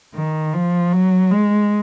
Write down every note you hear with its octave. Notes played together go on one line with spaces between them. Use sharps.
D#3
F3
F#3
G#3